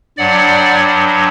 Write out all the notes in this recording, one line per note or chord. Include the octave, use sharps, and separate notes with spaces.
G2 F#3 D5 F#5